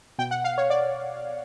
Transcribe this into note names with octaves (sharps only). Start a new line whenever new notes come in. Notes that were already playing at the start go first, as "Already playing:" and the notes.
B2 G5
F#5
F5
C#5
D5